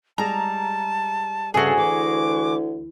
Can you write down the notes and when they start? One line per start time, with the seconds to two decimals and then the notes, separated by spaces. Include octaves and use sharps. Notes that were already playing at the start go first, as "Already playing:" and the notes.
0.18 G3 G#3 G#4 A5 A#5
1.54 D2 G2 C#3 F#4 G#4 A4 E5
1.77 E3 D6